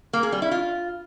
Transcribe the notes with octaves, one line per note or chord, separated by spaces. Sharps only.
A#3
G#4
G3
E4
F4